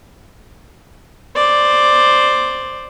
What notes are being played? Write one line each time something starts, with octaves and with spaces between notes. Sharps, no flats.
C5 D5